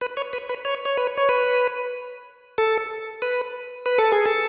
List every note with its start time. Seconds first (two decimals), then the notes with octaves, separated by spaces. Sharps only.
0.01 B4
0.17 C#5
0.33 B4
0.49 B4
0.65 C#5
0.85 C#5
0.97 B4
1.18 C#5
1.29 B4
2.58 A4
3.22 B4
3.86 B4
3.98 A4
4.12 G#4
4.26 A4